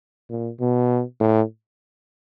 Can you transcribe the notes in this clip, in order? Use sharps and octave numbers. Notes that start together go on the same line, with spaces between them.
A#2
B2
A2